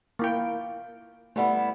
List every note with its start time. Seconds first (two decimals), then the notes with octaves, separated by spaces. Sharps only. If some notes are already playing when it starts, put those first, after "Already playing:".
0.19 A#3 E4 G5
1.36 G3 A3 B3 E4